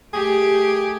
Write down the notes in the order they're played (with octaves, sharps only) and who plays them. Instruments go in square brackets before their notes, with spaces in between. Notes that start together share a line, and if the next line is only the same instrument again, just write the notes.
[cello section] A3 G4 [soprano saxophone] G#4